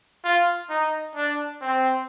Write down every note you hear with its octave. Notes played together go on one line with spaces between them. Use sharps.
F4
D#4
D4
C4